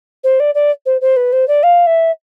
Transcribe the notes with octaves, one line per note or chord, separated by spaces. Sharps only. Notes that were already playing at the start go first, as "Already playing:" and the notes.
C5
D5
D5
C5
C5
B4
C5
D5
F5
E5